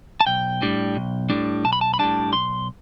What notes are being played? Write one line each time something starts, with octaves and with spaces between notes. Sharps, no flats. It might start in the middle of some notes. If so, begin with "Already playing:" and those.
A5
B1 G5
A2 G3 D4
B1
A2 G3 D4
B1 A5
B5
A5
B5
A2 G3 D4 A5
B1 C6